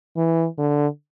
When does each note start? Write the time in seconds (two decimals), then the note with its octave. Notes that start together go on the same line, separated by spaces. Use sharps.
0.17 E3
0.58 D3